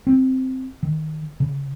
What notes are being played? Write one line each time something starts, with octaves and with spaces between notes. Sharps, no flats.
C4
D#3
C#3